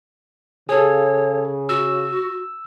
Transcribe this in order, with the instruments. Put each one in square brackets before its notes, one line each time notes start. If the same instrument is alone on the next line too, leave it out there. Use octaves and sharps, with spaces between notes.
[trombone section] C#3 [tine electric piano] G#4 A4 [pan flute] C#5
[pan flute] F#4 [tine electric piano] E6